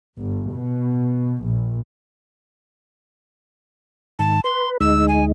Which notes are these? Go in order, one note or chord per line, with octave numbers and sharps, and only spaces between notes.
G1
B2
A#1
G#2 D#3 A5
B4 C6
D2 G#3 D#4 E6
G#5